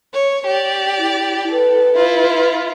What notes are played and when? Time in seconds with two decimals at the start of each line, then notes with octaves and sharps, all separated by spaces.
0.14 C#5
0.47 G4 D5
0.98 E4
1.51 A4 B4
1.96 E4 F4